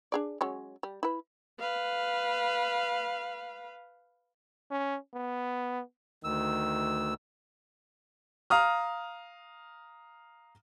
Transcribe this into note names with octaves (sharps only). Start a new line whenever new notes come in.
D4 G#4 D5
F#3 G#3 C#4
G3
E4 B4
B4 F5
C#4
B3
D2 D#3 E6
F5 A#5 D#6 F6